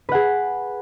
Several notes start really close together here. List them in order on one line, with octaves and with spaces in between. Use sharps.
B4 F#5 G#4